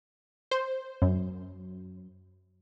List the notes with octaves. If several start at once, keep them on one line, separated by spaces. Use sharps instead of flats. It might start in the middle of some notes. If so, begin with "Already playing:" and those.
C5
F#2